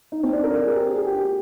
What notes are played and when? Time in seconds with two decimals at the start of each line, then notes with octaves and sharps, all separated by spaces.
0.12 D#4
0.23 C4
0.33 D4
0.43 A#4
0.55 A#4
0.65 G#4
0.75 G4
0.95 G#4
1.07 G4